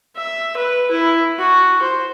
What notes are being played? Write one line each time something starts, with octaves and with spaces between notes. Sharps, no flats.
E5
B4
E4
F#4
C5